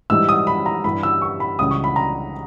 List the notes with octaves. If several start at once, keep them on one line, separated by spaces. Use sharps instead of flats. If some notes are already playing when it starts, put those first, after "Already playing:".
G#2 E3 G3 E6
D#6
B5
A#5
G2 E3 G3 B5
E6
C#6
B5
C#2 C#3 E3 G3 D#6
C#6
B5
A#5